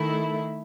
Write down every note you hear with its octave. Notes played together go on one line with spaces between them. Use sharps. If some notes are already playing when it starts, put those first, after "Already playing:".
Already playing: D#3 A3 E4